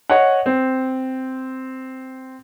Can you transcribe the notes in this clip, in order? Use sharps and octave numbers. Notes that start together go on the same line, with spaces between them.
C#5 D#5 F#5
C4